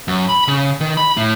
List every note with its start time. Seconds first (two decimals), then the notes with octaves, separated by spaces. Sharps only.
0.08 F#2
0.29 B5
0.48 C#3
0.80 D#3
0.97 B5
1.17 A2